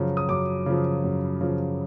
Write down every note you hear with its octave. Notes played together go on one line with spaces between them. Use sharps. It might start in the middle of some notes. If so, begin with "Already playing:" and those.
Already playing: F#2 C#3 F3
D#6
F#2 D6
C#3 F3
F#2
C#3 F3